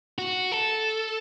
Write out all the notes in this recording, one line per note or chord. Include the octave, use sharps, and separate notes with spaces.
F#4
A4